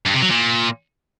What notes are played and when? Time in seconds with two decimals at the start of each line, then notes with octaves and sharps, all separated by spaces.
0.05 G2
0.14 C3
0.22 F#3
0.30 A#2